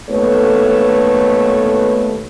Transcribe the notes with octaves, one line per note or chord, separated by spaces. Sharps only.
D#2 A3 B3 A4 B4 C#5